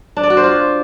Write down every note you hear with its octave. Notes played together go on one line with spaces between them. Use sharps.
D4
D5
F#4
C5
F4